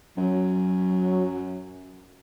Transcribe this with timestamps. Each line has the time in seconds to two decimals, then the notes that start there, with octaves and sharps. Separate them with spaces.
0.18 F#2 F#3